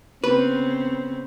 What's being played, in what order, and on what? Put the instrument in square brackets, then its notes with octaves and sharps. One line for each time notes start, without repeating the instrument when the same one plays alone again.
[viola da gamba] C#3 B3 C4 [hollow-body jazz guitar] B4